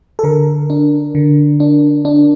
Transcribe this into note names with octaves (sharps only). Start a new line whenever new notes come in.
A4
D3 A#4
D4
D3
D4
D4